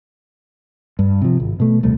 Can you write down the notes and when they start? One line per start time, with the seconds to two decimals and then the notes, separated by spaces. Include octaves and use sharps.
0.99 G2
1.22 C3 F3
1.40 G#1
1.60 B2 A3
1.83 D#1 C2 A3